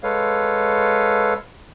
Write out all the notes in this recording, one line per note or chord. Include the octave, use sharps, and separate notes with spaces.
G#3 A4 B4 C#5 F5